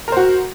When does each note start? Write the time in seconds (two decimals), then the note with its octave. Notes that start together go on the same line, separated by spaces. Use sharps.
0.08 A#4
0.12 C5
0.17 F#4